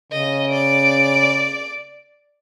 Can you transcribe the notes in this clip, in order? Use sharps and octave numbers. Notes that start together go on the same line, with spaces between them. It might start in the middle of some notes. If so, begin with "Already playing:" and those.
C#3 D#5
D5 D7